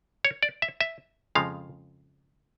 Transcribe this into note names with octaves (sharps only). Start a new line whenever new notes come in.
C#5
D5
E5
E5
F2 C#3 F3 G#3 F5